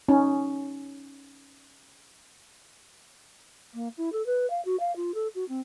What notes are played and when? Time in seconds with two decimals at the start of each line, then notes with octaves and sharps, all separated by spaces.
0.09 C#4 D#4
3.74 A#3
3.97 E4
4.12 A4
4.26 B4
4.50 F5
4.65 F#4
4.80 F5
4.96 F4
5.14 A4
5.35 F#4
5.48 C4